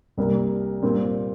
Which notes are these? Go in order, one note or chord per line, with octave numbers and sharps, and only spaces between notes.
C2 C3 G3 A#3
A#2 G3 C4